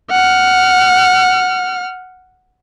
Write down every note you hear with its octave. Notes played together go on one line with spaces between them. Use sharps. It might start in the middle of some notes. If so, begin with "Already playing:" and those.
F#5 F6